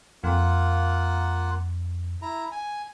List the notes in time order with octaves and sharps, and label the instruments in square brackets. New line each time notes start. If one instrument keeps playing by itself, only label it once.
[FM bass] F2 [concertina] A#3 F4 F#5
[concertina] E4 A#5
G#5